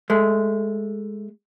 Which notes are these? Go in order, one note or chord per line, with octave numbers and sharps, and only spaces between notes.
G#3 A3